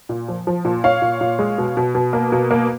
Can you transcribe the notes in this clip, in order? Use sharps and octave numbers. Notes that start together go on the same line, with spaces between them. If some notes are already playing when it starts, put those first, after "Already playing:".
A#2
F3
F3
A#2
A#2 C#5 F5
A#2
A#2
G#3
B2
B2
B2
A#3
B2
A#3